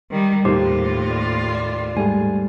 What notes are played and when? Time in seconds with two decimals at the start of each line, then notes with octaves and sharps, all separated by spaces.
0.11 D#3 G3
0.45 D#2 A2 A#3 F4 G4 C5
1.11 D5
1.55 D5
1.97 G#2 G3 A3 G#5